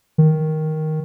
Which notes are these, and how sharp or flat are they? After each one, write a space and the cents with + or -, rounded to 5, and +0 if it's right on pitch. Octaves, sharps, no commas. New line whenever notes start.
D#3 +5